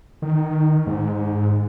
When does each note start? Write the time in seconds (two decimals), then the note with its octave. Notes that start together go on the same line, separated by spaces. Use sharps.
0.22 D#3
0.87 G#2